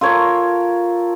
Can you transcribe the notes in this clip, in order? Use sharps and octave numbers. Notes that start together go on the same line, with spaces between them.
F4 A4 A#4 C#5